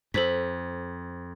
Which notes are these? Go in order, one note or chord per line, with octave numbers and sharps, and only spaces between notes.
F2 A4 C5 B6